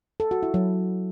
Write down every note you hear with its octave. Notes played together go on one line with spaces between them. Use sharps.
A4
F#4
E4
F#3